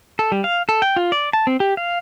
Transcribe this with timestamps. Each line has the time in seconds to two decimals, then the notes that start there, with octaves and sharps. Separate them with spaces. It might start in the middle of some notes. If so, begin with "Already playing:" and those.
0.19 A4
0.32 G3
0.44 F5
0.69 A4
0.82 G5
0.96 F4
1.12 D5
1.33 A5
1.47 C4
1.60 G4
1.77 F5